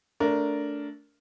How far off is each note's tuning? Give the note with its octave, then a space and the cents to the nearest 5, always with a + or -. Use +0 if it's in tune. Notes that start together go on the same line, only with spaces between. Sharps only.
A3 +5 D4 -20 A#4 +0